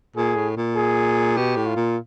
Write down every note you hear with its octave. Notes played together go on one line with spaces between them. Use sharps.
A#2 G#4
A2
A#2
G#4
B2 G4
A2
F4
A#2